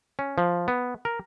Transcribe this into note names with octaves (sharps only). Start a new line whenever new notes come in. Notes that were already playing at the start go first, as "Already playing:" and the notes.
C#4
F3
B3
A#4